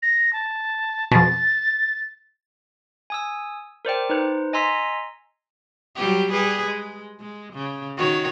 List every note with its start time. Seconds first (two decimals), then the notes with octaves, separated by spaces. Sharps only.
0.02 A#6
0.33 A5
1.12 F2 B2 A6
3.10 G#5 D#6 E6
3.85 A#4 C5 D5 G5
4.10 D#4 B4 C5
4.53 D#5 G#5 A#5 C6 E6 B6
5.95 F#3 G3 G4
6.31 G3 G#4 B4
6.66 G#3
7.20 G#3
7.54 C#3
7.98 D#3 F#4 C#5